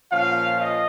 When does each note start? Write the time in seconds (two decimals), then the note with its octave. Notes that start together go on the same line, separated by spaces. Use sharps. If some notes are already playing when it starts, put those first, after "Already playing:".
0.11 A#2 F3 C#4 F4 F5
0.58 D#5